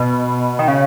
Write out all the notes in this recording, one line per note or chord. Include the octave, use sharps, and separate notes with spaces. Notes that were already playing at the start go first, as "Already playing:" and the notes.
Already playing: B2
D#3
C#3